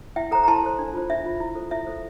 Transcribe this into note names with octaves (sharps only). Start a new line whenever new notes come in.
E4 E5 G5
A4 C5 G5 A#5
A#5
E4 A5 C6
A4 C5
D4
F4 C5
D4 E5
F4 C5
E4
A4 C5
E4 E5
A4 C5